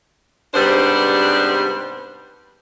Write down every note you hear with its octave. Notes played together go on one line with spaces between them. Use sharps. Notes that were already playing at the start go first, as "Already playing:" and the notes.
G#2 C3 G3 B3 D4 C5